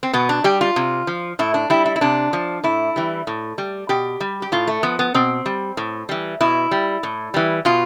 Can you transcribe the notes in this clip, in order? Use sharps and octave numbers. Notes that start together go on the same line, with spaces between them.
C4
B2 B3
D4
G3 G4
F4
C3
F3
A2 E4
D4
G3 E4
E4
E4
C3 D4
F3
A2 E4
E3 G3
A2
G3
B2 G4
G3
G4
A2 F4
A3
F3 B3
B3
B2 C4
G3
A2
E3 G3
B2 E4
G3
A2
E3 G3
B2 F4